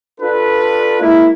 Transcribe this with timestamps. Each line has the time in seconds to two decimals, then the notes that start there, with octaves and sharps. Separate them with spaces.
0.21 D4 F4 A4 B4
1.01 G#3 A#3 E4